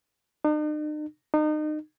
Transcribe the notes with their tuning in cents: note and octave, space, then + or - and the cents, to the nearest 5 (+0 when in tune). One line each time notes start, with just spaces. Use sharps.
D#4 -45
D#4 -30